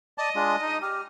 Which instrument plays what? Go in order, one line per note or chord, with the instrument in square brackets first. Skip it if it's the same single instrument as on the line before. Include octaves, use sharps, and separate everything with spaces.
[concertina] D5 A5 [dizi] D#5
[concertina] G#3 D4 F4
D#4
[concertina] G4 [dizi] F6